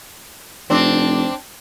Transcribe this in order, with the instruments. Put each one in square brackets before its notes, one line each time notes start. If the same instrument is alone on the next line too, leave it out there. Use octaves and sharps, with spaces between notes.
[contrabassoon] F1 [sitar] C4 D4